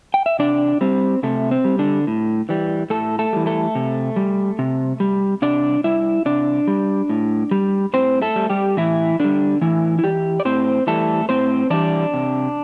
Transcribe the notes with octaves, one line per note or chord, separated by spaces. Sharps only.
G5
E5
C3 D4 D5
G3 C4
C3 A3
C4
G3
D3 D4
A2
E3 G3
A2 A3 A4
A3 A4
E3 G3
A3 A4
C3
G3
C3
G3
C3 D4 D5
G3 E4 E5
C3 D4 D5
G3
A2
G3
A2 C4 C5
A3 A4
G3
G3 G4
A2 E3 E4
D3 E3 G3 D4
A2 E3 E4
E4
E3 G3 G4
D5
A2 C4 C5
E3 G3 A3 A4
A2 C4 C5
E3 G3 D4 D5
C3